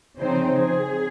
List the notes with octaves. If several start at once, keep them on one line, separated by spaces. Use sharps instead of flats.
C#3 F3 C4 D#4 C5
G#4